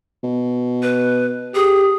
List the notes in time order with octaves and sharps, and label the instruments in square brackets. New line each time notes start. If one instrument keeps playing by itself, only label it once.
[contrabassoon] B2
[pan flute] B4
[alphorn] G4 [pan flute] G#4